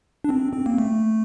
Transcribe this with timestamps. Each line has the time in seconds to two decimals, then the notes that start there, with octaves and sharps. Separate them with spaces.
0.24 D4
0.29 C4
0.53 C4
0.66 A#3
0.78 A3